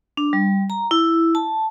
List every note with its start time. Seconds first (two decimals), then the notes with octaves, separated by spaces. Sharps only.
0.17 D4
0.33 G3
0.70 A#5
0.91 E4
1.35 A5